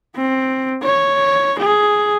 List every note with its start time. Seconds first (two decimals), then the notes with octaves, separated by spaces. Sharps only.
0.16 C4
0.83 C#5
1.59 G#4